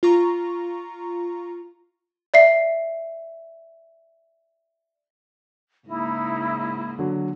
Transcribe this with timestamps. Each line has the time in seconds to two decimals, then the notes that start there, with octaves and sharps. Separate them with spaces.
0.03 F4 A#5 C#6
2.34 D5 E5 C7
5.87 G#2 C#3 A#3 D#4 E4
6.99 D3 F#3